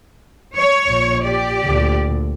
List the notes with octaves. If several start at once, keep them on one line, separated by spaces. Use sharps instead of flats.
C#5
A#1
G4 D5
D2 A#2